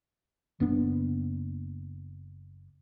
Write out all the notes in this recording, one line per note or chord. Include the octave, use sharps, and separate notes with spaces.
F#1 B3 D4